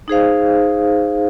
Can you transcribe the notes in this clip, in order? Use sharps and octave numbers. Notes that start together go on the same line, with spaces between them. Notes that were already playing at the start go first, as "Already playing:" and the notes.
D#4 G#4 C5 F5